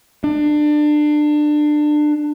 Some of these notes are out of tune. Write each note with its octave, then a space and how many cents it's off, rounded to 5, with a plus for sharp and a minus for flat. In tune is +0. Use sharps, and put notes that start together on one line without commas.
D4 +25